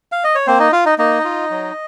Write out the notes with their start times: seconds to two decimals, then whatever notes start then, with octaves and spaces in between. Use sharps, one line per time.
0.12 F5
0.24 D#5
0.35 C#5
0.47 A#3 C4 C5
0.60 D#4 D#5
0.72 F4 F5
0.85 D#4 D#5
0.98 A#3 D#4 D#5
1.25 F4
1.50 F#3